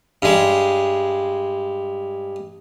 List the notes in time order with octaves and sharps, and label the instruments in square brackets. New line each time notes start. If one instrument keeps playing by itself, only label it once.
[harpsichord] G2 G#3